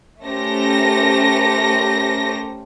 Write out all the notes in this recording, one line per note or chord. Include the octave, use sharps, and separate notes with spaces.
A3 C#4 G4 A#4 C5 A#6